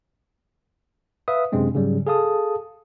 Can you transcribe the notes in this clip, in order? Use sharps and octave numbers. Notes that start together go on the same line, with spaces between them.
B4 E5 F5 D#6
F#2 C3 G#3 C4 D4
G#2 C#3 F#3 G3
G#4 A4 F5 A5 D#6